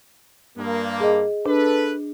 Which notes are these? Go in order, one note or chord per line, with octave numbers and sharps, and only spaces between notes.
G2 A#3
G#4 D#5
D4 A4 B4